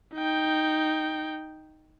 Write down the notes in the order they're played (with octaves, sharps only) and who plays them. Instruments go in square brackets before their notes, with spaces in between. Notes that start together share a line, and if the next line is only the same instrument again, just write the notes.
[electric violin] D#4 G5